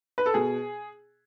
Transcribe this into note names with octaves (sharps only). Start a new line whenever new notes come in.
B4
A4
B2 G#4